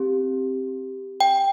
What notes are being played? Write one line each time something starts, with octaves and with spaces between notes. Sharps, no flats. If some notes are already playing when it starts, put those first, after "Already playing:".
Already playing: C4 G4
G5